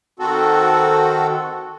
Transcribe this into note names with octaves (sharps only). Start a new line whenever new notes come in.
D#3 C4 F#4 A4